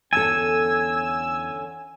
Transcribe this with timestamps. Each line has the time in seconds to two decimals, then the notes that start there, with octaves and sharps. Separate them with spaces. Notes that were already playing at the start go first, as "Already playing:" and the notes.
0.13 E2 D3 C#4 A4 G#5 E6